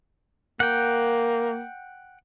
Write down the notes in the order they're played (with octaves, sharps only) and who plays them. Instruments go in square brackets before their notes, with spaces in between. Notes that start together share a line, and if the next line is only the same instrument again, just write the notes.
[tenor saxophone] A#3 [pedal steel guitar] F#5 G5